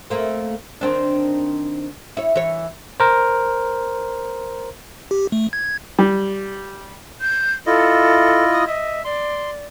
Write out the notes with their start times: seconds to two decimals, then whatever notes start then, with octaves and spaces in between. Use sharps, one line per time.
0.10 A3 A#3 C4
0.81 D#3 C4 D4
2.17 E4 C#5
2.35 E3 C#5
3.00 A#4 C5
5.11 G4
5.32 A3
5.53 G#6
5.99 G3
7.21 G6
7.66 E4 F4 A4 D#5
8.51 D#6
8.67 D#5 E5
9.05 D5 C6